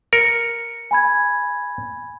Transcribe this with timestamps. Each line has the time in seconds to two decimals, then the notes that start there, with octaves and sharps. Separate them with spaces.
0.13 A#4 C#7
0.91 G#5 B5 G#6